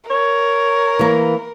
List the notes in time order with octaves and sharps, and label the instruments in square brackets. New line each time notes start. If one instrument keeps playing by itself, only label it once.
[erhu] A#4 [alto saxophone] C#5
[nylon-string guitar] E3 A#3